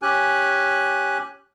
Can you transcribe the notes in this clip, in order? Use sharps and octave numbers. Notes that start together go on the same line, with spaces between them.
C#4 G4 G#5 F#6